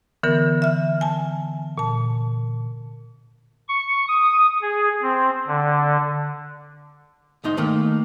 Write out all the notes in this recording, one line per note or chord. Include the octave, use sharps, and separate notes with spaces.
D3 E3 B3 A#4
E5 F6
G#5 A5
A#2 A5
C#6
D#6
G#4
C4
D3
D2 G#2 D#4 C6
D#3 A3 A#3